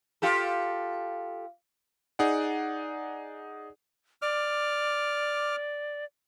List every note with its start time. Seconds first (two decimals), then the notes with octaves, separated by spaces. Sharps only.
0.22 F4 G4 A4
2.19 D#4 G#4 D5 F#5
4.22 D5 D6 F6